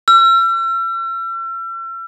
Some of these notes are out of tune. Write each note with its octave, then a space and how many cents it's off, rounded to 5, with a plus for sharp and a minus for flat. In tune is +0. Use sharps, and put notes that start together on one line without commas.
E6 +45